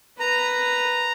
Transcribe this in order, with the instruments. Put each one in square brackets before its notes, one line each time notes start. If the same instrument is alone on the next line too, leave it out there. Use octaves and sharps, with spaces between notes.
[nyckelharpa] B4 [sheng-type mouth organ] A#5